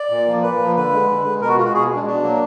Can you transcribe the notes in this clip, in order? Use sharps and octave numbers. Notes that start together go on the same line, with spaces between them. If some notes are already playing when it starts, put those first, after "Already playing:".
Already playing: D5
A#2
F3 A#3
A#2 B4
F3 A#3
D3 B4
G#3
D3
G#3
B2 A#4
F#4
G#3 F4
F#4
B2 G#4
G#3
D4
B2 D4
F#3 A#3